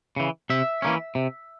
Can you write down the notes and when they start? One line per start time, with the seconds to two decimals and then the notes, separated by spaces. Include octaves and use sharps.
0.16 C#3 E3
0.50 C3 E5
0.82 E3 A#3 C#4
1.15 C3